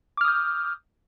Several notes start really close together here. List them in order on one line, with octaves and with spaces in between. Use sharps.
D6 F6 D#6 G6